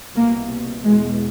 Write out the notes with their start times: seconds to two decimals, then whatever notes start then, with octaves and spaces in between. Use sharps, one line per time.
0.16 C2 B2 A#3
0.84 E2 B2 G#3